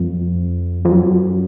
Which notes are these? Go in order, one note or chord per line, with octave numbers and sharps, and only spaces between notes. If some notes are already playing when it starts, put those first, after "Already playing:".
Already playing: F2
F2
F#2